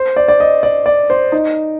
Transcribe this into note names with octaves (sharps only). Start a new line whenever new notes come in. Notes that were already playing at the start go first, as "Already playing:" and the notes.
Already playing: C5
D5
D5
D#5
D5
D5
C5
D#4